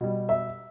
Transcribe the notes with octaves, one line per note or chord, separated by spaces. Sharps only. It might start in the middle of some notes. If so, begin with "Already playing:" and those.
B2 G3
E5